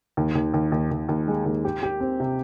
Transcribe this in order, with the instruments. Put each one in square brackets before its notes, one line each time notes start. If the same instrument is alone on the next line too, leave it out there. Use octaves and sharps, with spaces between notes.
[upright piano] D#2
D#2
D#2
D#2
D#2
D#2
G#3
D#2
G4
G4
C4
C3